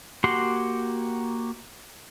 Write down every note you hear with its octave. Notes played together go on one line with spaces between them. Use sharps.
A#3 F#4 G4 F#5 C6